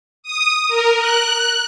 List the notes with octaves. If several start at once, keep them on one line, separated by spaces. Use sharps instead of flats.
D#6
A#4
F#6